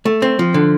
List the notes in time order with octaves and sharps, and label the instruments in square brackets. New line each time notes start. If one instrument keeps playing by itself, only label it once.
[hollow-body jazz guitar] A3
C4
F3
D3